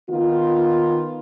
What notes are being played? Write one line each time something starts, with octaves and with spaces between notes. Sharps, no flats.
D#3 B3 F4